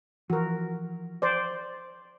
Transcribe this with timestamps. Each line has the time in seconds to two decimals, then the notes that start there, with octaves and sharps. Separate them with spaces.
0.30 E3 F3 F#4 A#4
1.22 C5 D5